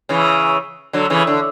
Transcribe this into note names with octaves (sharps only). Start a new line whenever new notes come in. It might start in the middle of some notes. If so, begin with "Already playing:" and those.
C#3 E3
D3 F#3
C#3 E3
D3